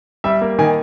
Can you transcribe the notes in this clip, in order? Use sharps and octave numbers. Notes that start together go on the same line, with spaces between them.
G3 E5
A#3
D#3 G#5